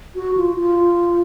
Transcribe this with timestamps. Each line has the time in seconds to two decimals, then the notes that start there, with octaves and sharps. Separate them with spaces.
0.16 F#4
0.37 F4
0.60 F4